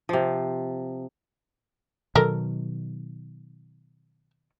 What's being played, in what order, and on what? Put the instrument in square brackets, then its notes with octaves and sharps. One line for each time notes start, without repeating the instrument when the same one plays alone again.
[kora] C3 F3
[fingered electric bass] B2 D#3 F#3 [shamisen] A4 A#4